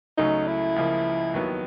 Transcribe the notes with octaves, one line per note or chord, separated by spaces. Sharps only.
C#2 C#3 F#3 A3 D#4
E4
C#2 C#3 F3 A#3
D#2 D#3 F#3 B3